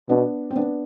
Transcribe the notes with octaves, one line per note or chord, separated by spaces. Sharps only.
B2 B3 D4
C4
B3 D4